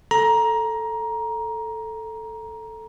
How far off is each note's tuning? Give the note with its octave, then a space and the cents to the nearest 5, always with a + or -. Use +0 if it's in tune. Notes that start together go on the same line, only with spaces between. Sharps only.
A4 +0 A#5 +15